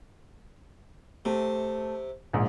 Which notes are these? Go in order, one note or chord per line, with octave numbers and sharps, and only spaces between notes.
C3 A3
A#1 G#2